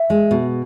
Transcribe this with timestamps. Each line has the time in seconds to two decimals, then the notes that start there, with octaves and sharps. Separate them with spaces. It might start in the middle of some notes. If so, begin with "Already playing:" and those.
Already playing: E5
0.10 G#3
0.31 B2